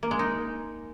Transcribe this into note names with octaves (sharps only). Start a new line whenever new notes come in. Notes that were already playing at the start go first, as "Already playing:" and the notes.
A#3
G#3
D#4